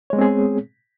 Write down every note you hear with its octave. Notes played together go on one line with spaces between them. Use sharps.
G#3 B3 C4 G#4 C#5